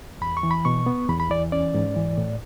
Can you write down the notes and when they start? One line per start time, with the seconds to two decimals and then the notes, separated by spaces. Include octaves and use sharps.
0.21 E2 B5
0.37 C#6
0.43 E3
0.51 B5
0.65 B2 C#6
0.86 B3
1.08 E2 B5
1.20 B5
1.30 E3 D5
1.52 C#4 D5
1.74 G#2
1.96 E3
2.18 A2